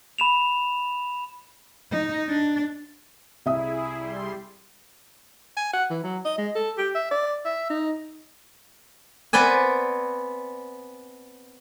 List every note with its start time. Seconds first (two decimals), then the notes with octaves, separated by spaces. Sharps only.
0.18 B5 E7 F7
1.91 D#4
2.28 D4
3.46 C2 E4 G#4 E5 D#6
3.97 G3 C6
5.57 G#5
5.74 F#5
5.90 E3
6.03 F#3
6.25 D#5
6.38 G#3
6.55 A4
6.78 G4
6.95 E5
7.11 D5
7.45 E5
7.70 D#4
9.33 B3 C4 B4 D5 G#5